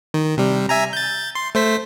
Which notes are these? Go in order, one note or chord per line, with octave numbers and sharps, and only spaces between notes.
D#3
C3 G3
E5 G#5 A#5
G6 A6
C6
A3 C5 B6